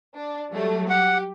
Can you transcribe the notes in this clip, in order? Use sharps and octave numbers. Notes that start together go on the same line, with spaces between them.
D4
F#3 G3 A3
G4 F#5